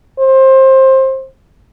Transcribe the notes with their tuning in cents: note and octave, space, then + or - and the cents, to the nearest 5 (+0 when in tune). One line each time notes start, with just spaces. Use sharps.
C5 +20